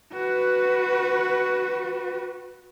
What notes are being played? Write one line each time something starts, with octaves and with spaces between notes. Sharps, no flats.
F#4 B4